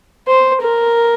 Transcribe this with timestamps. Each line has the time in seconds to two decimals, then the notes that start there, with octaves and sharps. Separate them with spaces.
0.28 C5
0.62 A#4